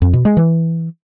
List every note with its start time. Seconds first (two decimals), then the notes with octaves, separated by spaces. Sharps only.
0.02 F2
0.13 B2
0.25 G#3
0.37 E3